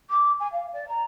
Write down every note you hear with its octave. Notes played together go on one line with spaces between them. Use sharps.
D6
G#5
F5
D5
A#5